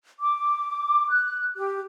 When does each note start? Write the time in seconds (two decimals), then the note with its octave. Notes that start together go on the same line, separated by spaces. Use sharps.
0.20 D6
1.10 F#6
1.57 G4